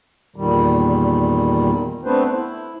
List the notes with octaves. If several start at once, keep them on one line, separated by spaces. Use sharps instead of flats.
E2 A#2 D#3 G3
A3 B3 C4 D4 B4 C5
E4